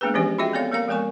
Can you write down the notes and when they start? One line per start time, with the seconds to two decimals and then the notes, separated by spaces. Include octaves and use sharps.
0.01 G#3 A#3 B3 D4 G#4 B4
0.14 E3 F3 C4 C#4 G4 D#5
0.38 F4 F#4 G#4 D#5 E5 G5
0.54 B3 C4 A4 C#5 D5 F5
0.72 A#3 A#4 D5 F5 A#5
0.88 F3 G#3 B3 A#4 G#5 C#6